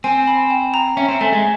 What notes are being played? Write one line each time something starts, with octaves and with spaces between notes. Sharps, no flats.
C4 G#5
B5
G5
A#5
C#4 E5
C4
A3 G#5
G#3